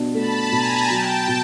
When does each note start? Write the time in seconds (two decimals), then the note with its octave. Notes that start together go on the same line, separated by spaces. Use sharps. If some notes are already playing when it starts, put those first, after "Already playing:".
Already playing: B2 D4
0.13 A3 A5 B5
0.52 B2 G#5 A#5
0.90 F#3 G5 A5
1.28 B2